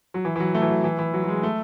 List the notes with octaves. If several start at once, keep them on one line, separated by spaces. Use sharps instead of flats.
F#3
E3
E3
F#3
A3
E3
F#3
E3
E3
F#3
F#3
G#3
A3